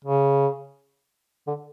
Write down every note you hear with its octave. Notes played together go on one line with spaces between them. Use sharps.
C#3
D3